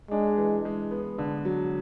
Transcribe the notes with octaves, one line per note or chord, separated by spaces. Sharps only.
G#3 D4
E3
G#3
B3
D3
F#3